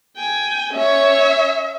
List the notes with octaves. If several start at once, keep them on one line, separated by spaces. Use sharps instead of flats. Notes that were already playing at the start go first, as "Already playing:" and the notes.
G5 G#5
C#4 C#5 E5